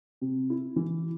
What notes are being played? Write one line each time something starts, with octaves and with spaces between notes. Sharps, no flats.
C3
E4
E3